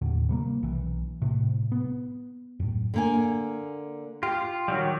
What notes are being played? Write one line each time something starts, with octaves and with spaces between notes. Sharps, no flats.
D#2 A2 D3
C3 G3 A#3
B1 E3
A2 C3
B3
F#2 A2
D3 A#3 G#5
F4 G4
D#3 F#3 G3